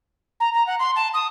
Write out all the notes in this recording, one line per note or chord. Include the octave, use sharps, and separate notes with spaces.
A#5
A#5
F#5
C6
A5
D#6